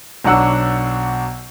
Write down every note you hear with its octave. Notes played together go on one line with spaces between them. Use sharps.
B1 F#3 D4 F#5 E6